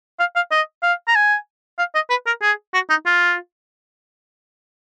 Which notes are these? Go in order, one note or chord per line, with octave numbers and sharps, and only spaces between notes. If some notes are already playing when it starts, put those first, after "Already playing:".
F5
F5
D#5
F5
A#5
G#5
F5
D#5
B4
A#4
G#4
F#4
D#4
F4